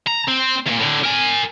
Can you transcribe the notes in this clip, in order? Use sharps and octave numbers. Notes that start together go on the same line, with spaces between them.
A#5
C4
E2 A#2
A2 D3
A#4 G#5